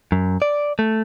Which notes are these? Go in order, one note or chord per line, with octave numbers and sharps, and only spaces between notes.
F#2
D5
A3